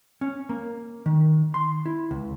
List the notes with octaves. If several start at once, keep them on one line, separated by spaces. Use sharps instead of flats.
C#4
A#3
D#3
C6
E4
C#2